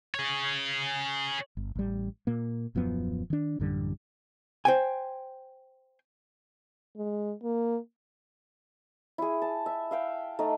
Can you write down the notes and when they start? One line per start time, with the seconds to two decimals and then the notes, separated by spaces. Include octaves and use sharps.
0.14 G#4 C#5
1.57 G1
1.75 A1 G3
2.27 A#2 A#3
2.75 D#1 F#2 F3 B3
3.30 D#3 D4
3.60 A1 F#2 D3 G3
4.65 C5 G5 G#5
6.97 G#3
7.43 A#3
9.18 E4 G#4
9.42 A5
9.66 E5
9.91 E5 F5 G5
10.39 A3 D#4